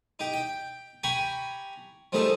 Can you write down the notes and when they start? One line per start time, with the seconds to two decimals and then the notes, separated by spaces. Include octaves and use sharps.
0.19 D#4 G4
0.33 G5
1.03 G4 G#5 A#5 B5 C#6
2.12 F3 G3 A3 D#4 G#4 A4